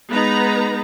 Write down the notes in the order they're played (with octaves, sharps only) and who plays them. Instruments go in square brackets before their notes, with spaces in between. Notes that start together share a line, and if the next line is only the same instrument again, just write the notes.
[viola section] G#3 B3 D#4 B4 A#5